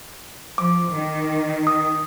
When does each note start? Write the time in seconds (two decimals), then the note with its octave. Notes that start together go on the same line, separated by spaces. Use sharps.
0.58 F3 D6
0.91 D#3
1.67 D#6